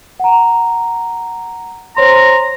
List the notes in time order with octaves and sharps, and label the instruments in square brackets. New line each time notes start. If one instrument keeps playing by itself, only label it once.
[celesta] F#5 A#5
[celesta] C5 C#5 C6 [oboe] A#5